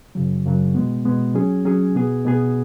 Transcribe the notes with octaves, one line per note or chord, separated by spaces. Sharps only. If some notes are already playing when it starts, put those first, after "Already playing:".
F#2 C#3 F#3
F#2 C#3 F#3
B2 G#3 B3
B2 G#3 B3
F#3 C#4 G#4
F#3 C#4 G#4
B2 B3 G#4
B2 B3 G#4